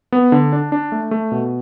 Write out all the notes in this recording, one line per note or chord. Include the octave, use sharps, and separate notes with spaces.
B3
D3
D4
D4
A3
A3
B2